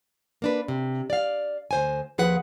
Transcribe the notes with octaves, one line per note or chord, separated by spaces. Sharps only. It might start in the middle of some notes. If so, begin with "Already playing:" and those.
A#3 D4 B4
C3
D5 F5
D2 C5 G#5
D#2 F3 G#4 B4 F#5